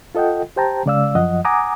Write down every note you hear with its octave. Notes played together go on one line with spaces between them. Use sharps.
F4 A4 D#5 F#5 G5
G4 C5 G5 A5 A#5
C#3 G#3 D5 F5 E6
F#2 F3 D#5 F#5
F#5 G#5 A#5 D6 D#6